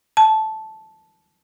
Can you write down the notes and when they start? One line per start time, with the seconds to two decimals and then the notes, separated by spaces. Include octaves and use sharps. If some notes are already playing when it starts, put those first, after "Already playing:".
0.17 A5